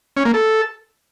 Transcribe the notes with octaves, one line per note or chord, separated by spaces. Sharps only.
C#4
A#3
A4